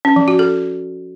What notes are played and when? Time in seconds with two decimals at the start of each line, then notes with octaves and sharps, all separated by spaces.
0.05 C#4
0.16 F3
0.28 F#4
0.39 A4